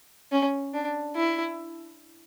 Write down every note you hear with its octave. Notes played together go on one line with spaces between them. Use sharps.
C#4
D4
E4